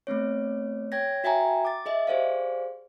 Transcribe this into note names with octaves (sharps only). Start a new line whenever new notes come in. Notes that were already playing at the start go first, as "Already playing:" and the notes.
A3 B3 C4 C#5
C#5 G5 G#6 A#6
F#4 E5 G5 G#5 A#5
D6 A6
G#4 D#5 E5
G4 G#4 C5 D5 F5